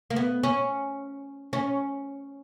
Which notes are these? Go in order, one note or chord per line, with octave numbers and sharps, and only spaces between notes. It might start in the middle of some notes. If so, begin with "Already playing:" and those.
A#3
B3
C#4
C#4